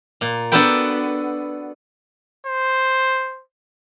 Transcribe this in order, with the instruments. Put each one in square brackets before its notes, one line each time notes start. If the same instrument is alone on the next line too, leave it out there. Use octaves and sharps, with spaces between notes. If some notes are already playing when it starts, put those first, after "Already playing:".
[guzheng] A#2
B3 D4 F#4 A4 B4 G5
[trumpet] C5